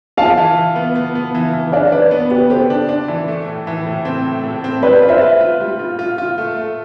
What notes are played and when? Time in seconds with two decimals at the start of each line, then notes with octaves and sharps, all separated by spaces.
0.17 F4 F5 A5
0.37 E3
0.57 E3
0.76 B3
0.96 B3
1.15 B3
1.35 E3
1.53 E3
1.72 D4 D5 F5
1.92 D4 B4 D5
2.11 B3
2.31 B3 G4 B4
2.50 G4 A4 C5
2.70 D4
2.89 D4
3.08 E3
3.28 A3
3.47 A2
3.67 E3
3.86 A2
4.05 C4
4.25 A3
4.44 A2
4.64 C4
4.83 G3 B4 D5
5.02 F4
5.08 C5 E5
5.21 B4
5.40 F4
5.60 G3
5.79 F4
5.99 F4
6.18 F4
6.38 A3
6.57 A3